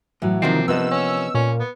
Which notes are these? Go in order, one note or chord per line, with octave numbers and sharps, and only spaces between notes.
A2 E3 F#3
C3 D#3 F3 A#3 C4
G2 B3 D#5 E6
C#4
A#2 C#4
B3